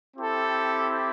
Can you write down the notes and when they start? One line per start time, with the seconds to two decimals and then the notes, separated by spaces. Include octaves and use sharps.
0.17 C4 E4 G4 A4